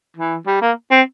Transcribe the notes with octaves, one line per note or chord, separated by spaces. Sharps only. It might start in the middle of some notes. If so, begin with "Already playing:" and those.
E3
G3
A#3
C4